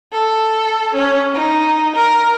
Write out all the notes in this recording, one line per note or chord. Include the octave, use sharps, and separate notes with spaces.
A4
C#4
D#4
A#4